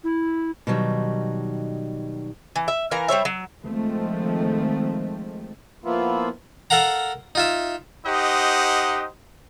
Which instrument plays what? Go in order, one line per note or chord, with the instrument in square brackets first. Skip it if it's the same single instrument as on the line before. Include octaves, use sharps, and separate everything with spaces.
[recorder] E4
[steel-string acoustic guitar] B2 D#3 F#3 G3
[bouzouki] E3
E5
E3 A#4 F5 A#5
G3 C5 C#5 E5
F#3
[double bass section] D#3 F3 G#3 A3 C4
[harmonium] F3 A#3 B3 E4 F4
[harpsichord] A4 A#4 F5 F#5 A#5
D#4 F4 E5
[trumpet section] D#4 G4 C5 D#5 F#5